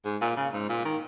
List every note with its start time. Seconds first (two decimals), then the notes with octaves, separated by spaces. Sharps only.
0.05 G#2
0.21 A#2
0.37 C#3
0.53 G#2
0.69 A#2
0.85 D#3